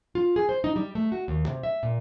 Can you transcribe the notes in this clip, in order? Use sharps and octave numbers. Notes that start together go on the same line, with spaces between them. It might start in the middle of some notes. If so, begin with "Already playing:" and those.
F4
G#4
C5
D#4
G3
A3
F#4
D#2
C3
E5
A#2